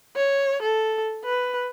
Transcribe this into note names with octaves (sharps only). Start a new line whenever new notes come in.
C#5
A4
B4